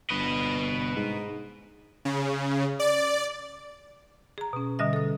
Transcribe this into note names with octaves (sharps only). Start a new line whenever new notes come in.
G1 B4 D#5
G#2
C#3
D5
G#4 A#5
B2 C#4
B2 D3 G3 D#5 E5
A4 D#6